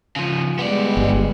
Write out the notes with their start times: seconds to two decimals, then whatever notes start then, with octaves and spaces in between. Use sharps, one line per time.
0.16 C#3 F3
0.59 G3 G#3 B3 D5
0.97 G1